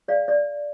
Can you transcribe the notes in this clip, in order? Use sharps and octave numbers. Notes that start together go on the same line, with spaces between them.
G#4 D5 F5
D5